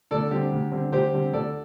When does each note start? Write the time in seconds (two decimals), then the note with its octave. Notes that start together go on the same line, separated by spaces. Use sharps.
0.11 D2 A4 D5
0.31 D3 G3 C4 G4
0.52 D2
0.72 D3 G3 C4
0.92 D2 G4 C5
1.13 D3 G3 C4
1.32 D2 A4 D5